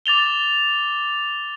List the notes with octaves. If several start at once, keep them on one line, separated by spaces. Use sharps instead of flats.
D6 A6 F7 G7